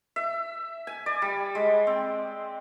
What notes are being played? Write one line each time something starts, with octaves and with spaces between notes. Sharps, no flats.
E5
G#5
D5
G3
G#3
C4